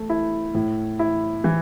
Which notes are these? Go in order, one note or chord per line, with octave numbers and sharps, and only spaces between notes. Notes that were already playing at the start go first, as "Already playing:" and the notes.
Already playing: A3
E4
A2
E4
E3